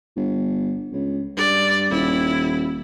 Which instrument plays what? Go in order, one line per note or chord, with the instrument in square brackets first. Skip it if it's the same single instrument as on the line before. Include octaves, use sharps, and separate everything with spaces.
[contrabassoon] G1
C#2
[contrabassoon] G2 [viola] D5
[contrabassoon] D#1 [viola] E4